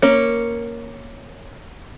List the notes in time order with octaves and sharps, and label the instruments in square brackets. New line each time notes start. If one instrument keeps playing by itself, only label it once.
[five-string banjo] A#3 C#4